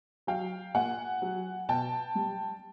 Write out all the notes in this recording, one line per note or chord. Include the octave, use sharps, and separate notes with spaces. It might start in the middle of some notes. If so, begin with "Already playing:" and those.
F#3 F5 G5
A#2 F#5 G#5
F#3
B2 G5 A5
G3